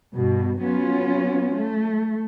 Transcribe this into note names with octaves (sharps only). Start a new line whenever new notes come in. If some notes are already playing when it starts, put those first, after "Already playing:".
G2 B2
F#3 B3 C#4 F4
A3